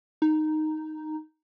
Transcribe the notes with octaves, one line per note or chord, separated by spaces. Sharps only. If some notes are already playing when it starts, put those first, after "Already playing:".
D#4